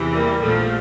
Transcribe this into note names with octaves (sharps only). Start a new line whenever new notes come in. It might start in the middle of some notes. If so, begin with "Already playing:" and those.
Already playing: E2 C3 E3
G3 A#3
A#1 A#2 F3 A3